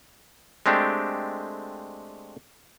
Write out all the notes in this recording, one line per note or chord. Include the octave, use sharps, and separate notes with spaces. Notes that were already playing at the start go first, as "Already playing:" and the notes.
G#3 A3 C4 D4 G4